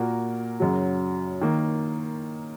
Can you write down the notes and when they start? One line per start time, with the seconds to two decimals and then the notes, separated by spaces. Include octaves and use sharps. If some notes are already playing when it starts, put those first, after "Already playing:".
Already playing: A#2 A#3 F#4 A#4
0.60 F#2 C#3 F#3
1.41 D#3 A#3